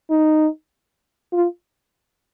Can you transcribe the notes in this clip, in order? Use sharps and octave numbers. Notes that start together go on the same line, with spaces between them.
D#4
F4